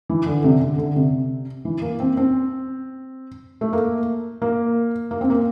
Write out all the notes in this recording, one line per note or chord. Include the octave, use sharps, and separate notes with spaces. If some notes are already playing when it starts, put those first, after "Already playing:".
E3
D3
C3
D3
D3
C3
E3
A#3
C4
C4
A3
A#3
A#3
A#3
C4
A#3